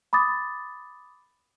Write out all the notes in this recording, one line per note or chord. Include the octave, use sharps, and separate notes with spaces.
B5 D6 D#6 A6